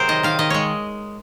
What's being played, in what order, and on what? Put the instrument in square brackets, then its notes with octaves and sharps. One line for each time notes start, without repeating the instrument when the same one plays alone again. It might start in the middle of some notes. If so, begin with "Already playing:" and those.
Already playing: [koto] C3 F#3 C4 G#4 A#4 C5
D#3 D#5
D#3 F5
D#3 D#5
G#3 C#5